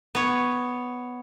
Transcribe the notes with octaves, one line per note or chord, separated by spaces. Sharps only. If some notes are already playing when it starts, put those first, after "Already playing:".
B3 C#5